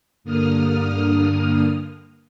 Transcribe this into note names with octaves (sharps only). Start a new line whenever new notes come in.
G2 D3 A#3 D#6 F6